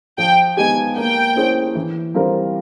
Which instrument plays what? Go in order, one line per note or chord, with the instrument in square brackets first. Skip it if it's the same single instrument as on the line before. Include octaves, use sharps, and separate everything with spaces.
[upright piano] F3 [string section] G5
[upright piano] G#3 B3 D#4 G4 [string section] G#5
[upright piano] A#3 [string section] G5
[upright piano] C#4 E4 G#4 C5
E3
G3 C4 F4 A#4